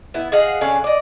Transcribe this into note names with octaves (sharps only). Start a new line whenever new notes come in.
B3 E4
G#4 D#5 F5 F#5
D3 C#4 F5 F#5
D5 D#5